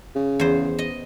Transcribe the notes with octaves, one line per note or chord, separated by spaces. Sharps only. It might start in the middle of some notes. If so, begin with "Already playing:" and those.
C#3
E2 C5
D#5